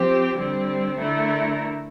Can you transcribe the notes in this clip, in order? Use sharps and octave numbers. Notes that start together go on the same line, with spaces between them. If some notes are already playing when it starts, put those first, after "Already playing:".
Already playing: F3 C4 G4
D3 G3 C4
D3 A3 E4 A#4